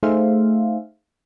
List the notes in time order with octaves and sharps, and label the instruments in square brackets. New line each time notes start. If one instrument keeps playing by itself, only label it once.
[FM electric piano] A3 D#4 G#4 C5 E5 F5